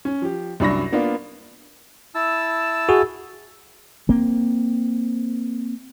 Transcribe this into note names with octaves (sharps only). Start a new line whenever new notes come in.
C#4
F3 G4
C2 F#2 D4 B5 C#6 A#6
A#3 B3 D4 F4
E4 A5 E6
F#4 G#4
A#3 C4